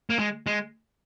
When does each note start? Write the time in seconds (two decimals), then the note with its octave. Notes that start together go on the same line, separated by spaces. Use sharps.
0.10 A#3
0.19 G#3
0.47 G#3